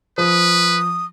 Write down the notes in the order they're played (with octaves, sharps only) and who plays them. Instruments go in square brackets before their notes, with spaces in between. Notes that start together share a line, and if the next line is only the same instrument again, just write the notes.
[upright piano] F3 [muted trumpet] B4 [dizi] D#6